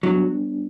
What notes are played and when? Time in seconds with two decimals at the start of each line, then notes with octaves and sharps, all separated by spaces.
0.03 F#3 G3 B3 D4